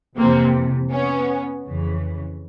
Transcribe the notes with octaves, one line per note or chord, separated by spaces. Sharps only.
F2 C3 E3 A#3 C4
B3 C#4
F2 C#3 E3